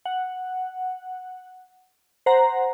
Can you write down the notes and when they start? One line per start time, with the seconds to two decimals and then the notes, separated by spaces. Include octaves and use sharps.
0.05 F#5
2.26 C5 F#5 A#5